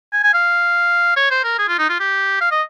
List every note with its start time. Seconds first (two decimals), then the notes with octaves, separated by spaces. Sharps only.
0.13 G#5
0.23 G#5
0.34 F5
1.17 C#5
1.31 C5
1.44 A#4
1.59 G#4
1.68 F4
1.79 D#4
1.89 F4
2.00 G4
2.41 F5
2.51 D#5